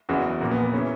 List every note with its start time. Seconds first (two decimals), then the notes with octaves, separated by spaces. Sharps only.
0.09 F#1 E2 C#3 E3 F#4
0.41 A#1 A#2 A#3
0.51 B3
0.62 B3
0.73 C#3 E3 C#4